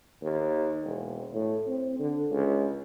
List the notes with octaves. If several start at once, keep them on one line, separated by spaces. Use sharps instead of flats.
D#2
E1
A2
C4
D3
C#2